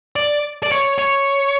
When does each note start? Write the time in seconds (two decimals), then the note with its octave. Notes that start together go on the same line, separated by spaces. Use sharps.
0.16 D5
0.63 D5
0.72 C#5
0.98 C#5